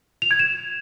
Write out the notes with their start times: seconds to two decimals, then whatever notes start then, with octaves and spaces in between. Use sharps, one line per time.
0.22 F7
0.31 G#6
0.39 E7